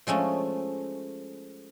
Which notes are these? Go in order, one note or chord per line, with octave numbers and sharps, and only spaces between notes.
F3 G#3 A3 C#4